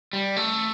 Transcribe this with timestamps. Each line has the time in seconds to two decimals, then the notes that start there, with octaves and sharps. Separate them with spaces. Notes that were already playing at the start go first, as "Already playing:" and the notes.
0.13 G3
0.36 A3